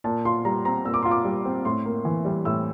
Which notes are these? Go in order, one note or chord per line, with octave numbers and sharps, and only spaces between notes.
A#2 A5
F4 C6
G3 A#5
C4 A#5
A#2 E6
D6
F4 C6
D6
G3
C4
A2 C6
A#3
E3
G3
A2 E6